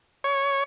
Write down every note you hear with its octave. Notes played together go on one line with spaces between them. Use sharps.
C#5